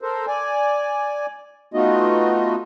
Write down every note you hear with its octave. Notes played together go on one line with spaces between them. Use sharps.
A4 A#4 C5
D5 G#5
A3 B3 D#4 F4 F#4 D#5